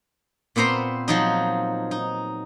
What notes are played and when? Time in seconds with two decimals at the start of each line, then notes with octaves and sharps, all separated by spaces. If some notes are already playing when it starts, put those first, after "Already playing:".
0.56 A#2 B3 C4 C5 A#5 C6
1.08 F3 F#3 D#4
1.91 D#4